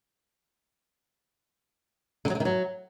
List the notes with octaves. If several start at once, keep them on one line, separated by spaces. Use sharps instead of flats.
D3
F#3
D3
D#3
F#3